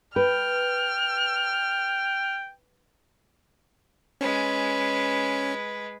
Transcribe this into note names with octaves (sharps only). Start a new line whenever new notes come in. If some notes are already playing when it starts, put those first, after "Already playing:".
B4 G5 F6
G#3 C#4 B4